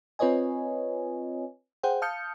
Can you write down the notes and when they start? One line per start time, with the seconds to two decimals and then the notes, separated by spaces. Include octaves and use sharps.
0.19 C4 F4 B4 C#5 D#5 G#5
1.83 G#4 C5 F#5 G5
2.02 F5 A5 D#6 F6 G6 C#7